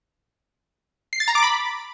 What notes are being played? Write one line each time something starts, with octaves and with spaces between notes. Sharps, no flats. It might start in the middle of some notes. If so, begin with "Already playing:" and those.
C7
A6
A#5
D6
B5